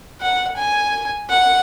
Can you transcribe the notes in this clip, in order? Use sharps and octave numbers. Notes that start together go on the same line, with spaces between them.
F#5
G#5
F#5